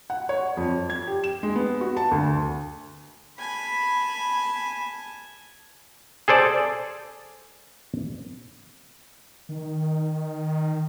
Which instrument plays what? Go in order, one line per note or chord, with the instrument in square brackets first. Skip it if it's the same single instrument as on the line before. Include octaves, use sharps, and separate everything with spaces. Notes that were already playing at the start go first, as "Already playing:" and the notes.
[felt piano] F#5
C#5
F2
G#6
G4
E7
G#3
B3
F#4
A5
D2
[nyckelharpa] G#5 A5 [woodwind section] B5
[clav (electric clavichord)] G#4 A4 C5 D5
[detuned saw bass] D#3